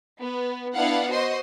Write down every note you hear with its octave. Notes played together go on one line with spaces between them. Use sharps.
B3
B3 D4 E4 F5 F#5
F#4 C5 D#5 C6